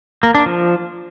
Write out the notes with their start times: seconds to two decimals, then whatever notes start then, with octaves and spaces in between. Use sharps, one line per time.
0.23 A#3
0.35 D4
0.46 F3